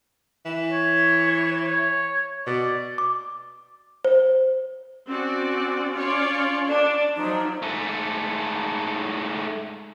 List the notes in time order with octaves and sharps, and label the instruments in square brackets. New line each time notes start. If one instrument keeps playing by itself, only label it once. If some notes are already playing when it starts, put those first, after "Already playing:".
[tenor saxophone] E3
[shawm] C#5
C#5
[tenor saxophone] B2 [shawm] D5
[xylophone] D6
C5
[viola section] C4 F#4 D5 [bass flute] C#4
[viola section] F4 C#5 D5
[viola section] D4 [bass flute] D5
[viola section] F3 F#3 D4 [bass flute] D#4
[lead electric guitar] G#2 A3